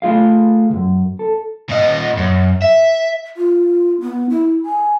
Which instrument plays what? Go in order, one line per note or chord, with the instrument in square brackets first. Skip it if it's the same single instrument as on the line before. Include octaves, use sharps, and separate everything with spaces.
[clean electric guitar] A3 F4 G#4 F5
C#2 F#2
A4
[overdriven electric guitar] A#2 D#5
F#2
E5
[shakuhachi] F4
B3
E4
G#5